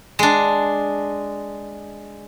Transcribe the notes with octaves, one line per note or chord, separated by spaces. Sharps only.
G#3 D4